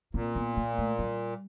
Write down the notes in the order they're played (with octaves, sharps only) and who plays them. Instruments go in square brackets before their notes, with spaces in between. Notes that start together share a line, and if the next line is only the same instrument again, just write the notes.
[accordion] A#2 [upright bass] C4
[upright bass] B3
A#3
A3
G3